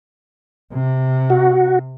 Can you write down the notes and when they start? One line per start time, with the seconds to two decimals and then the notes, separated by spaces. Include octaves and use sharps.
0.74 C3
1.30 F#4